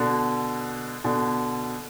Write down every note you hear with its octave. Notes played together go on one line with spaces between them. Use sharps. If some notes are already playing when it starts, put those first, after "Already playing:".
Already playing: B2 D3
B2 D3